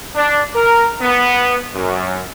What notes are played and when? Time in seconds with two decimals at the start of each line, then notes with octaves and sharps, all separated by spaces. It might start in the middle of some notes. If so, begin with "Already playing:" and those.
0.14 D4
0.54 A#4
1.00 B3
1.73 F#2